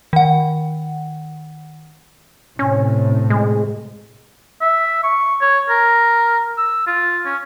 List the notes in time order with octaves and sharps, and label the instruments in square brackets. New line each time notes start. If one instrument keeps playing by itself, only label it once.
[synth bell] D#3 F#5
[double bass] A2 C3 [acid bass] C#4
[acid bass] G#3
[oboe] E5
C#6
C#5
A#4
E6
F4
C#4